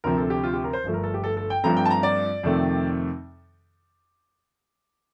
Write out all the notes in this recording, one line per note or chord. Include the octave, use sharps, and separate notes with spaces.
D2 C3 F3 C4 A#4
A4
G4
F4
G4
A#4
C5
G1 G2 F3 A3
A#4
A4
G4
A4
A4
G5
G2 F3 A3 C4 A#5
G5
A5
A#5
D5
F2 C3 D#3 A3 C4